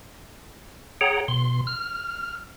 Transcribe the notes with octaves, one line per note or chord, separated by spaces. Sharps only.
G#4 C#5 F#5 G5 A#5
B2 C6
F6